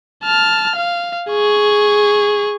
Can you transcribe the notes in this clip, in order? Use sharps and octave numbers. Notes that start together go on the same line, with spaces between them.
A5 F6
F5
G#4 C#6